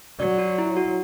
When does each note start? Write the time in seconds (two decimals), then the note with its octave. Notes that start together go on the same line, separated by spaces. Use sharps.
0.19 F#3 D5
0.38 F#4
0.58 E4
0.77 F#4